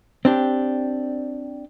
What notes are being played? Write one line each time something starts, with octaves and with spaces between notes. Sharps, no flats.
C4 D4 G4